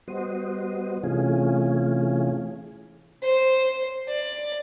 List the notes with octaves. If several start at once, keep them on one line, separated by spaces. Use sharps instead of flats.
G3 B3 F#4 C5 D#5
C3 E3 A3 C#4 F4 G#4
C5
D5